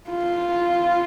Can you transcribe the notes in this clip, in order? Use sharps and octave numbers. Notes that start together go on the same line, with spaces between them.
F4